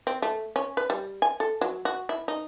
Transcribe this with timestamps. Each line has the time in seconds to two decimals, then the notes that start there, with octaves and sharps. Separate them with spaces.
0.07 C4
0.22 A3
0.56 C#4
0.77 B4
0.90 G3
1.22 G#5
1.40 A4
1.61 F#3
1.85 F#4
2.09 E4
2.28 D#4